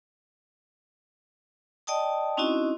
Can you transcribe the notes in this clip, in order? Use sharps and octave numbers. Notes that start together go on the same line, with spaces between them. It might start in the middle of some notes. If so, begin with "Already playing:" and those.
D5 D#5 G5 A5 D#6
C4 C#4 D#4 E4 F#4 D#5